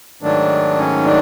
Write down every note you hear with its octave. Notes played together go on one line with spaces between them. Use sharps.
G#2 D#3 F#3 A3 D4
C#4
D4